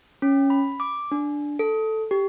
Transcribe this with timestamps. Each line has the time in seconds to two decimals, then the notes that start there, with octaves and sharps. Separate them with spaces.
0.22 C#4
0.50 B5
0.80 D6
1.12 D4
1.59 A4
2.11 G4